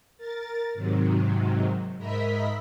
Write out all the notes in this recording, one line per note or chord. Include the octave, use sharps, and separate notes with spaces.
A#4 A6
G#2 C3 D#3 F#3
G#2 A#4 D#5 E5 B5 B6